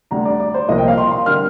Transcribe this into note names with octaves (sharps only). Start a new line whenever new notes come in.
D2 D3 G3 A#5
D5
D5
C5
C2 A#2 F3 A#3 D#5
G5
F5
C6
C6
D3 G3 A#3 F6